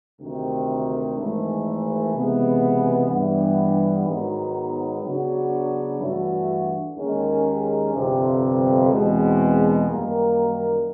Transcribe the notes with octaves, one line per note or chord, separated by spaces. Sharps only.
D2 C3 D#3
G#1 G#2 E3 A3
C#2 C3 E3 G#3 B3
G2 E3 G3 B3
G#2 D#3 F#3 B3
C#3 F#3 B3 D4 F#4
G2 E3 A3 D4 F#4
D#2 D#3 G#3 C#4
G1 F2 C3
E2 B2 G#3 C4
F#2 D#3 G3 A#3